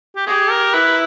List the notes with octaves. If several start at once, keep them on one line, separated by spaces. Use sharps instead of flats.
G4
G4 G#4
A#4
E4 B4